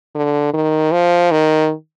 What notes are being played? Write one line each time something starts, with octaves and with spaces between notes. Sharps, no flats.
D3
D#3
F3
D#3